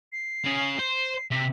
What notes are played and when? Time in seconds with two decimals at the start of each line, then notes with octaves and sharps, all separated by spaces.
0.12 C7
0.44 C#3 G#4
0.79 C5
1.31 C3 B6